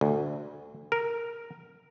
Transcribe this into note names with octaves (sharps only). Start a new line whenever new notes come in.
D2
A#4